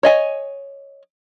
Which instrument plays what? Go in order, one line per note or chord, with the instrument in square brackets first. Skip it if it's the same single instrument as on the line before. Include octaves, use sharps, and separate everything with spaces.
[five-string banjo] C#5 D#5 G#5